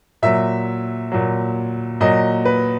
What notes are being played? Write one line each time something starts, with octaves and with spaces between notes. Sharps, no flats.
A#2 F#3 E5
A#2 F#3
A#2 F#3 D#5
B4